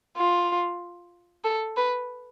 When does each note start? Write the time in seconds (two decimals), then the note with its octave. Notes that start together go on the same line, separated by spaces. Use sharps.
0.17 F4
1.44 A4
1.77 B4